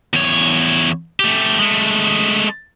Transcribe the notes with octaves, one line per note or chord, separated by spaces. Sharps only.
E2 C#5
A3 G4
G#3 A3